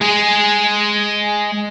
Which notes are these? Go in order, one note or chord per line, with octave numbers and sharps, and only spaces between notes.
G#3 G#4